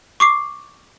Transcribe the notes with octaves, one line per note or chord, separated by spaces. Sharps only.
C#6 D6 C7